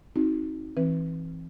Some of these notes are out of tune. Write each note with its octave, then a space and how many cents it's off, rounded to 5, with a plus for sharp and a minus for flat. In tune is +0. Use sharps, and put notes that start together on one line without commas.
C4 +25 D#4 +25 F#4 +0
E3 +0 C4 +15 B4 -5